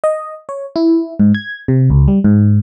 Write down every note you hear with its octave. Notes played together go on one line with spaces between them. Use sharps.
D#5
C#5
E4
G#2
G#6
C3
C#2
G3
G#2